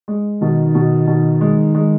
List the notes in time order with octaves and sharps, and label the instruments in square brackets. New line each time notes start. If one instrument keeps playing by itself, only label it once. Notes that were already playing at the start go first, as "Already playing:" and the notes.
[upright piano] G#3
[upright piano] B2 [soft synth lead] D#3
[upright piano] B2
B2
G#3
G#3